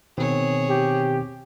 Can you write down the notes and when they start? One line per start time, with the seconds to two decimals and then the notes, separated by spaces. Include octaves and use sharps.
0.18 B2 D#3 C4 G#4 C#5
0.69 G4